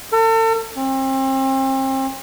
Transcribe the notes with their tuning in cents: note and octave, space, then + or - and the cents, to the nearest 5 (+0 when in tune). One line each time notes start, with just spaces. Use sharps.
A4 +40
C4 +35